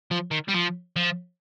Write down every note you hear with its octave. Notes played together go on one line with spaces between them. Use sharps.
F3
D#3
G3
F3
F3